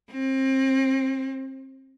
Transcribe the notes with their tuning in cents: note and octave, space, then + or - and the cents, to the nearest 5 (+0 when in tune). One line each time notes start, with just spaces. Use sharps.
C4 +30